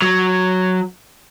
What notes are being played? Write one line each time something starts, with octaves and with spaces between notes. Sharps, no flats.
F#3